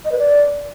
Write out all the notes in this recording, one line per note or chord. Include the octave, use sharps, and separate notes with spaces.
D#5
B4
D5